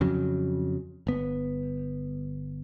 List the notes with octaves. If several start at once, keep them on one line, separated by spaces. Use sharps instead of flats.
F2 C#3 F#3
G1 B3